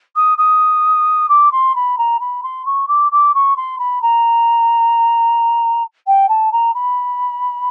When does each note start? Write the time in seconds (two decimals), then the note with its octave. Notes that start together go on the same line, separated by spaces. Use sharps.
0.16 D#6
0.38 D#6
1.29 D6
1.52 C6
1.75 B5
1.98 A#5
2.20 B5
2.43 C6
2.65 C#6
2.88 D6
3.12 D6
3.34 C#6
3.56 C6
3.79 B5
4.02 A#5
6.07 G5
6.29 A5
6.52 A#5
6.74 B5